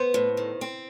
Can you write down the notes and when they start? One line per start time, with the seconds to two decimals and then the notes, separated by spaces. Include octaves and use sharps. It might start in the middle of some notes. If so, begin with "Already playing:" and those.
Already playing: B3 C5
0.14 A2
0.37 D#3
0.61 C4